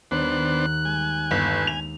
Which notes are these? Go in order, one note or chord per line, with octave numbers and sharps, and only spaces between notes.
D#2 B3 D4 C5 F#6
G#3 G#5
G1
F7